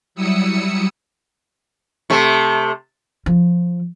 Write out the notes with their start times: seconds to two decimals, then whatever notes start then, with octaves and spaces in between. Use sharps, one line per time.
0.15 F#3 G3 E4 D#6 E6 C#7
2.10 C3 A3
3.26 F3